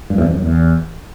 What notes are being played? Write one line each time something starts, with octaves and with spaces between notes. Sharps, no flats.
G2
E2
F2
F#2
E2